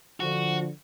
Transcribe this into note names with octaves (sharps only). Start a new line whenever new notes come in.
D3 F3 F#4